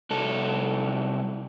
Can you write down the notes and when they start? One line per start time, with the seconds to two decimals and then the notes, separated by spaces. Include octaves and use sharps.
0.10 C2 A4